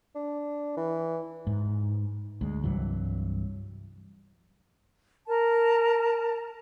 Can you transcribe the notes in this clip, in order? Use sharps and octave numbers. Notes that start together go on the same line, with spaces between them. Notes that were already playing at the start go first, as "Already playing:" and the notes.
D4
E3
G#2
D2 G#3
C2 G2 E3 F#3
A#4 A5